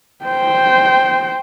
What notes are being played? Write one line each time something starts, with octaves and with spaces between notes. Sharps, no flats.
C5 G5